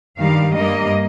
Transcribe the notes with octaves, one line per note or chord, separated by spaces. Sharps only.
G2 D#3 G3 F5
G2 G3 A#3 D#5